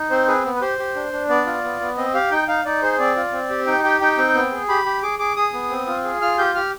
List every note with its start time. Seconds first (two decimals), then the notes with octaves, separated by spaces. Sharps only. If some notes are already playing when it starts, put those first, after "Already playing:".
Already playing: D#4
0.11 C4 C5
0.28 G#4 B4
0.45 B3
0.56 B4
0.61 G4 C5
0.78 G4
0.95 D4
1.13 D4
1.29 B3 D5
1.46 F4
1.64 B3
1.81 B3
1.97 C4 D#5
2.14 G4 F5
2.31 D#4 G5
2.48 D#4 F5
2.65 D#4 D5
2.82 G#4 C5
2.99 C4 D5
3.16 F4
3.33 C4
3.50 G4
3.67 D#4 G5
3.83 G4 G5
4.01 D#4 G5
4.18 C4
4.34 B3
4.52 G#4
4.69 G4 B5
4.86 G4
5.02 G#4 D6
5.19 G#4 D6
5.36 G#4 D#6
5.53 B3
5.70 C4
5.87 F4
6.04 G#4
6.21 F4 F6
6.38 G4 G6
6.55 G4 F6